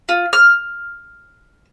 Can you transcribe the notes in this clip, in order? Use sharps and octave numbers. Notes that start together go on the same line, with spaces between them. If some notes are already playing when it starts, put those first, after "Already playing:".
F4
F6